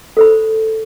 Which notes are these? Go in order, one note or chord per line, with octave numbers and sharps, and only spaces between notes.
A4 C5 B5